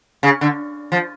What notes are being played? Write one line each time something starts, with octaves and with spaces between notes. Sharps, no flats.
C#3
D3
F3